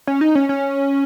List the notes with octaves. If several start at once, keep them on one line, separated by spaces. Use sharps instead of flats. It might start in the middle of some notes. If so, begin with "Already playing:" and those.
C#4
D#4
C#4
C#4